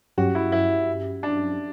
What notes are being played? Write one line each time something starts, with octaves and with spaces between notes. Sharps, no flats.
G2 F#3 C#4 F#4 G4
E4
E4
D4